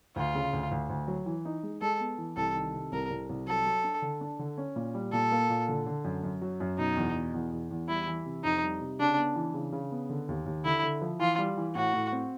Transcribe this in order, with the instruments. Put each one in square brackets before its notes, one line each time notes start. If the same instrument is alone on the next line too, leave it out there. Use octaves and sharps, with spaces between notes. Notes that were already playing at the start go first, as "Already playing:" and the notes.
[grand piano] D2 [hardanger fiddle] F4
[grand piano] C#3
D2
D2
D2
F#3
E3
D#4
G#3
[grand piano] G#3 [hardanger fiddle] A4
[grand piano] B3
E3
[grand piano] C2 [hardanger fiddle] A4
[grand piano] D#3
C3
[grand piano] C2 [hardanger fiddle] A#4
[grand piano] C2
C2
[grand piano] F#3 [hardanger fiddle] A4
[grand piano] F#3
D4
D3
D4
D3
C#4
A#2
G3
[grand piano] A#2 [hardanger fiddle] A4
[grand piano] A#3
A#2
D3
D3
F#2
F#2
F#3
F#2
[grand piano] B2 [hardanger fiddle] D#4
[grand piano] E2
B2
E2
E2
E2
[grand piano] G3 [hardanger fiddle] E4
[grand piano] E3
C3
[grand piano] F2 [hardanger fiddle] D#4
[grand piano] G3
C3
[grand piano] C#3 [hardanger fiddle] D4
[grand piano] B3
E3
C#3
C#3
B3
D3
D#2
D#2
[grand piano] D3 [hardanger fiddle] E4
[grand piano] D3
F3
[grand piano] E3 [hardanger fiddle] F4
[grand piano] G3
E3
[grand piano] A2 [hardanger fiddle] F#4
[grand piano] A2
C4